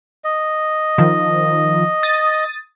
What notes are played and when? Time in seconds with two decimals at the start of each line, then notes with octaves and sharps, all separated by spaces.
0.24 D#5
0.98 D#3 F3
2.03 D#6 A6